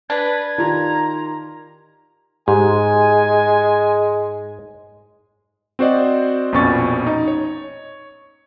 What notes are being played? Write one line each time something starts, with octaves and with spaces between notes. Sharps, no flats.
D4 B4 G#6
D#3 F4 G4 A#5
G#2 G#3 G4 G#5
C4 F#4 C5 D5 D#5
A#1 F2 B2 C#4 C#6 A6
D#4
C#5